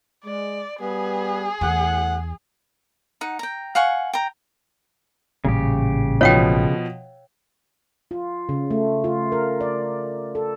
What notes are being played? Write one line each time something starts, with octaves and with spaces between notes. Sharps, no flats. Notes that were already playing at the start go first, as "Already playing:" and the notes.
G#3 D5
G3 B3 G#4 B4
E2 A2 F#5
D#4 F#5
G5 A#5
F5 F#5 G#5 C#6
G5 A#5
A1 A#2 C#3 G3 G4
B2 F3 C#5 F5 G5
F4
C#3
A3
F4
A#4
D5
A4